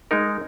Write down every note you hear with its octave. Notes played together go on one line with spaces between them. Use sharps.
G#3 D#4 A#4